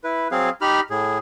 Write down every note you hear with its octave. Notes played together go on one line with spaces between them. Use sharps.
E4 B4
F#3 C4 G#4 F5
D#4 G4 B5 F6
A2 G#4